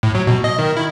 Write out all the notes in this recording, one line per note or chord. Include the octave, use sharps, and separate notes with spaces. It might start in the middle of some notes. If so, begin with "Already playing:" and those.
A2
F#3
B2
D#5
D#3
E4